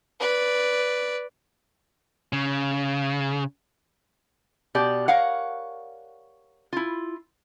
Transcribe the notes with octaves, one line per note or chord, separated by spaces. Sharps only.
B4 D5
C#3
B2 G4 D5
A#4 C#5 F5 F#5
E4 F4